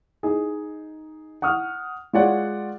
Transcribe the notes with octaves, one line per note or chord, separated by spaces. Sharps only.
D#4 G#4
F#5 C#6 D#6 F6
G#3 F4 C#5 D5 F#5